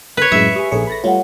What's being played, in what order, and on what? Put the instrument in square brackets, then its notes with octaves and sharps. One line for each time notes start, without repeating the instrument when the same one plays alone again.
[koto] B4 C#5
[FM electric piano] F#2 A2 G#3 [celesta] D4 [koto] E5
[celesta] G4 G#5 [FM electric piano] D#6
[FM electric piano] A#1 G#4 C#5 [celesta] D4 A4 C#7
[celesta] A4 A6 [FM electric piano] B5 A#6
[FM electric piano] G3 A3 F4 [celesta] C#5 F#5